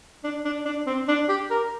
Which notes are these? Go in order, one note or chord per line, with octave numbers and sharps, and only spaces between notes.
D4
D4
D4
C4
D4
G4
A#4